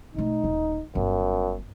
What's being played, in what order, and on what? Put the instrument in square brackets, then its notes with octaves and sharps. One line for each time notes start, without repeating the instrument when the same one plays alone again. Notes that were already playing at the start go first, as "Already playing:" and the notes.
[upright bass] B2 A3 [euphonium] D#4
[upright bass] D#1
[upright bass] G1 [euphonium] F#2